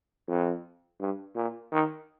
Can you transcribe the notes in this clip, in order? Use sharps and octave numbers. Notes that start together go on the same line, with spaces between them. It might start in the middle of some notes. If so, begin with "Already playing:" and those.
F2
G2
A#2
D#3